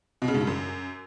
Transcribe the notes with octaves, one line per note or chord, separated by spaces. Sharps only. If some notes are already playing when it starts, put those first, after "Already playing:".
B2
C#3
G#2
G2
F#2